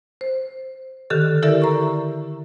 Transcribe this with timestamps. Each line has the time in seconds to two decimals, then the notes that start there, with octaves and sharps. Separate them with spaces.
0.21 C5
1.10 D3 D#3 G4 A4 F6
1.43 E4 G4 A4 A#4 D5 E5
1.62 A#5 C#6